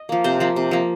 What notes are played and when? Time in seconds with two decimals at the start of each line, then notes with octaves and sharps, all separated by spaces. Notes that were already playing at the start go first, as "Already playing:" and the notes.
Already playing: D#5
0.09 F3 A#3
0.24 C3 C5
0.40 F3 A#3
0.56 C3
0.71 F3 A#3